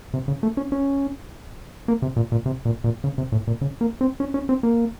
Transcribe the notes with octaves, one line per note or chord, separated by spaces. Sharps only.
C3
C#3
A3
C#4
C#4
A#3
C3
A#2
A#2
C3
A#2
A#2
C#3
C3
A2
A#2
C#3
A#3
C4
C#4
C#4
C4
A#3